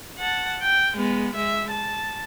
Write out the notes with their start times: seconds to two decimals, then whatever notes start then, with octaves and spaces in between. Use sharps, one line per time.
0.18 F#5 A5
0.62 G5
0.97 G#3 B3
1.35 G#3 E5
1.71 A5